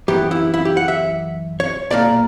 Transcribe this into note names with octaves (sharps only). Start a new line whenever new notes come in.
F#2 E3 B3 G4
E4
E4
G4
F#5
E5
C#5
B1 A#2 A#3 D5